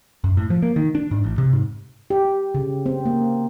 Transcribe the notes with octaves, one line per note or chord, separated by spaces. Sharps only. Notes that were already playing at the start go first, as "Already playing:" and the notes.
F#2
A2
F3
A#3
D#3
D4
G#2
A1
C3
G#2
G4
C#3
C4
A#3